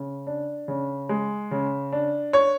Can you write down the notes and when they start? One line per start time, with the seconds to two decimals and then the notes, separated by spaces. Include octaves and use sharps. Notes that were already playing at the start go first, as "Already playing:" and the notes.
Already playing: C#3
0.27 D4
0.68 C#3
1.09 G#3
1.51 C#3
1.92 D4
2.33 C#5